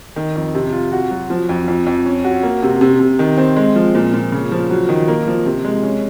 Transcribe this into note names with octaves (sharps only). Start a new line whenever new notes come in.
D#3
F2
C3
F4
F#4
F#3
F3
F2
F2
F2
C#4
F#4
A#3
C3
C3
C3
D#3
C4
G#3
F3
A#2
A#2
C#3
F3
F#3
D#3
A#3
F3
C3
G#3
C#4